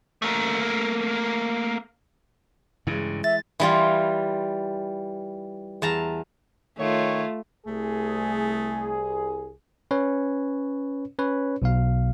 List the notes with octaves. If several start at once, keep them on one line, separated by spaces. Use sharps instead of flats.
A3 A#3
G2 C#3 E3 G#3
E5 A6
E3 G3 F4
E2 A5 A#5
D#3 A3 F4 C#5
C2 A3 G#4
C#4 B4 C#5
C#4 B4 C#5
B1 B2 F5